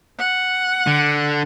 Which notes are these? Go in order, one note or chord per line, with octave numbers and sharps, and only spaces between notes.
F#5
D3